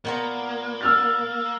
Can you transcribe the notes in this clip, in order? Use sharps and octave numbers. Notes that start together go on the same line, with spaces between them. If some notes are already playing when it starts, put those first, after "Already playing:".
A#2 A#3 B3 A#5
E6 F6 A6